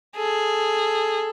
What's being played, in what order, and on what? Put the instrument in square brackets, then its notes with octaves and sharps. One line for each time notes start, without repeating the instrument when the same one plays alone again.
[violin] G#4 [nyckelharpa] A4